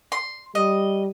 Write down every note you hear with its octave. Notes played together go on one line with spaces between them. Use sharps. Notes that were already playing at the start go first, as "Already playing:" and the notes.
C6
G3 D#5